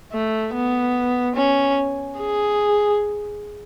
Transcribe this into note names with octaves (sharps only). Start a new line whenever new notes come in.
A3
B3
C#4
G#4